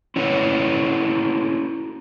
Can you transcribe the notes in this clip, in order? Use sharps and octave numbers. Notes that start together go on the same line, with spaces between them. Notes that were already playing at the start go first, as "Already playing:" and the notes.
C#4 E4 F#4 A4 B4 C#5